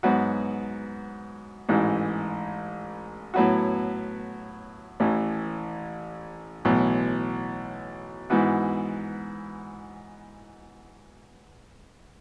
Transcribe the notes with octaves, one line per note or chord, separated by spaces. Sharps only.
G#2 F#3 B3 F#4
A1 G#2 E3
A2 F#3 B3 F#4
A1 A2 E3
B1 A2 E3
G#2 E3 B3 F#4